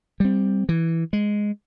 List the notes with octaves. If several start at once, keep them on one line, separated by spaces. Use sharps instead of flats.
G3 C4
E3
G#3